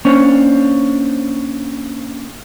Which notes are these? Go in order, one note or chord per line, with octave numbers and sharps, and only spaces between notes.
A#3 C#4 D4 C5 C#5